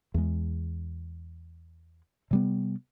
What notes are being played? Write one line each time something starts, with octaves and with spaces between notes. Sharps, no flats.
E2 G#3
C3 G3 B3